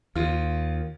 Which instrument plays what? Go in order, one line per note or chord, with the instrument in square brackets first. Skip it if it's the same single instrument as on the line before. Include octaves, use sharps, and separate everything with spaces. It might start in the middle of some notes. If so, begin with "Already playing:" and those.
[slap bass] D#2 [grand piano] F4